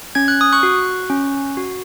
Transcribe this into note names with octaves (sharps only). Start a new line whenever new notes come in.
C#4 G#6
F#6
D#6
C#6 F#6
F#4
C#4
F#4